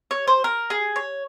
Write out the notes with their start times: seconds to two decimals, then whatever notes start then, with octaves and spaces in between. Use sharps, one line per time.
0.11 C#5
0.27 C5
0.44 A#4
0.70 G#4
0.96 C#5